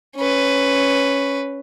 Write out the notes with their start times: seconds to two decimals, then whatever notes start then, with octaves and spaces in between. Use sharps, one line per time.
0.16 C#4 B4